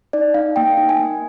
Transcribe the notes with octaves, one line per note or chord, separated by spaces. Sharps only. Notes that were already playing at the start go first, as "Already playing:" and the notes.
D#4 D5
D#4 F5
A#3 G5
D#4
G#5
A#3